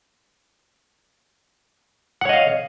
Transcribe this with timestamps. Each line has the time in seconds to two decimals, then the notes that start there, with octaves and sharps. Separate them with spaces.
2.21 F#5
2.25 C#5
2.29 D#5
2.33 F5